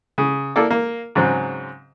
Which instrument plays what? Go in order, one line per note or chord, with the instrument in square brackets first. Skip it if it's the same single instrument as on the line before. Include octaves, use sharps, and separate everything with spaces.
[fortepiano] C#3
A#3 E4 A4 D5
A#3
G#2 C#3 F#3 C4